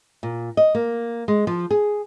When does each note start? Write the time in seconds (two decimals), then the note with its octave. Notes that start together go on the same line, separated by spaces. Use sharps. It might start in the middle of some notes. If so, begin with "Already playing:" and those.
0.23 A#2
0.57 D#5
0.75 A#3
1.28 G#3
1.47 F3
1.71 G#4